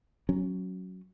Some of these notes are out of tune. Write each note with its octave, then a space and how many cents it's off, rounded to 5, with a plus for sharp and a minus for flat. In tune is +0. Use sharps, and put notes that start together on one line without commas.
F#3 +0 C#4 +0